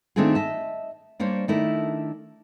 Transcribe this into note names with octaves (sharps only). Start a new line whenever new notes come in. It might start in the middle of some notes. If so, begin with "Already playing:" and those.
D#3 A3 C4 D4 F4 G#4
D#5 E5 A5
G3 A#3 D4 C5 C#5
D#3 A3 D4 E4 A#4